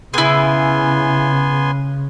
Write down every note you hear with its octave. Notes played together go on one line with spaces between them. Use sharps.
C#3 B3 E4 G#4 G#5 C6